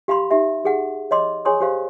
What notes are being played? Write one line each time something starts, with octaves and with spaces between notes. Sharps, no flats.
G4 F5 B5 C6
D#4 G4 E5
G4 G#4 F#5
C#5 D#5 C6 D6
G#4 C#5 G#5 C6 C#6 D#6
G4 C5 F5